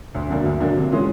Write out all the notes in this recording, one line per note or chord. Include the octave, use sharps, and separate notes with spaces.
D2
D3 F#3 A#3 D4
D2
D3 F#3 A#3 D4
C3
E3 G#3 C#4 F4